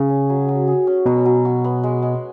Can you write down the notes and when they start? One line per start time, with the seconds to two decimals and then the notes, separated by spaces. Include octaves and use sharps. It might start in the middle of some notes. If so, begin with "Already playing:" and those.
Already playing: C#3 G#4
0.09 C#4
0.29 F#3
0.49 F#3
0.68 G#4
0.87 C#4
1.06 B2 F#3
1.26 F#3
1.45 F#4
1.64 B3
1.84 G#3
2.02 G#3